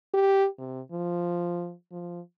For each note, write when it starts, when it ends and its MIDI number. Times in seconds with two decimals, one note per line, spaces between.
0.14 0.47 67
0.58 0.81 48
0.91 1.74 53
1.92 2.20 53